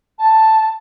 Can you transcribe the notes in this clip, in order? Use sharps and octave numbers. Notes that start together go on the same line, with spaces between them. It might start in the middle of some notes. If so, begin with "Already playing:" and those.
A5